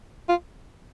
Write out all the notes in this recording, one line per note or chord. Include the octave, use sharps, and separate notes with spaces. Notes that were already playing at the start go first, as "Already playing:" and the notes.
F4